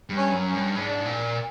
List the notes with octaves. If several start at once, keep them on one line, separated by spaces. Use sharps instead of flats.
G2
C#4
F#2
C#4
G2
G#2 D4
A#2